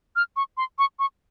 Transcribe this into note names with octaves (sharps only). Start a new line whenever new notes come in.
F6
C#6
C6
C#6
C#6